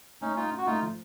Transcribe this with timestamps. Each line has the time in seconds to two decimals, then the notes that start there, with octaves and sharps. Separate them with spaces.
0.21 A3 C#4 D#4
0.37 A3 D#4 F4
0.51 C#4
0.58 F#4
0.66 A3 D#4 F4
0.82 F3